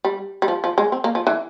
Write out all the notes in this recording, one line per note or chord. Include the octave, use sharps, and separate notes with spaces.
G3
G3
F3
F3
G#3
C4
A#3
F3
E3